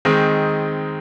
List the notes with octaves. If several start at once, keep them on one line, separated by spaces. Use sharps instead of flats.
D#3 G#3 C4 D#4